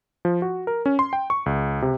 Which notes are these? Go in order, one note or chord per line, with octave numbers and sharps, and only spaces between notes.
F3
F#4
A#4
C#4
C6
G5
C#6
C#2
C3